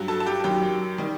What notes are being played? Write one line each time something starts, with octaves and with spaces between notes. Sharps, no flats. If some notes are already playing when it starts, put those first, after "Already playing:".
Already playing: G2 F#3
A4 A5
A5
G4 G5
F#2 D#3 F#3 G4 G5
D#3 G3